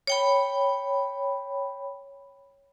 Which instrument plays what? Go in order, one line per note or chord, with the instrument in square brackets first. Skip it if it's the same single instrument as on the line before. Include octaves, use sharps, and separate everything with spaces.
[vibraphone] C#5 G5 B5